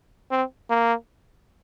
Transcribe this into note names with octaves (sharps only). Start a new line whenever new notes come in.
C4
A#3